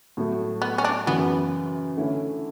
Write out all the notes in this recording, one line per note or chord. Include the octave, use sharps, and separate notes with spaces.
A2 F#3 A3
B3
C#4
D4
F#2 C#3 E3 B3
D3 A3 C#4 E4